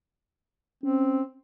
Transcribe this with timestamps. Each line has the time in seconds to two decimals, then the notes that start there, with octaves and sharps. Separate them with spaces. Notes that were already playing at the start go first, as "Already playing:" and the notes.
0.83 C4 C#4